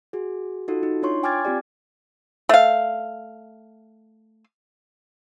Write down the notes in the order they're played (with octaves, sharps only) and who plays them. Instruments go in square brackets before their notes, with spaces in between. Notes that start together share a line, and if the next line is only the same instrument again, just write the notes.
[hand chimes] F#4 G#4
D#4 F4 F#4 A4
D#4
D4 F4 C#5 C6 C#6
G5 G#5 D6 F6 G#6 A6
C4 F4 G4 D5
[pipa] A3 F5